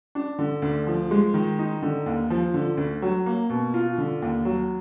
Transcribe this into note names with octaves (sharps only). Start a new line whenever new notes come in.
D4
D3
D2
F3
G#3
D#3
D#4
D3
D#2
F3
D3
D2
F#3
A#3
B2
F4
D3
D#2
F#3